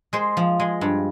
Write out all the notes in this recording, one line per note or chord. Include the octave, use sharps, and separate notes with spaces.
G#3 C5
F3
G#3
G2